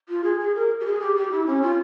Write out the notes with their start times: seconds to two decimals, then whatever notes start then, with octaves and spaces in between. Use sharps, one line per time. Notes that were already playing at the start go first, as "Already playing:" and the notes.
0.09 F4
0.24 G#4
0.40 G#4
0.55 A#4
0.80 G4
0.86 G#4
1.01 G4
1.16 G4
1.32 E4
1.46 C#4
1.62 F4